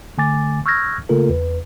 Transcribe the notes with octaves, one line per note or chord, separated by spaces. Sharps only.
D3 A3 G#5 D6 A6
C#6 E6 F6 G6 G#6 A#6
C#3 A3 A#3 F4 A4 A#4
E2 B4